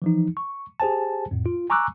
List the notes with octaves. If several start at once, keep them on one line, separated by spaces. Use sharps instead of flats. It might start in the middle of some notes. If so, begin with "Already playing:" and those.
E3 F3 D#4
C#6
G4 G#4 C5 G#5 A5
F2 A2
F4
G#5 A#5 C#6 D6 E6 F#6